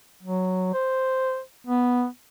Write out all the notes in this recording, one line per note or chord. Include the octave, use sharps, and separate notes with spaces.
F#3
C5
B3